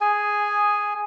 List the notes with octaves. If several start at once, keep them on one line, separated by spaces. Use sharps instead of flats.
G#4 G#5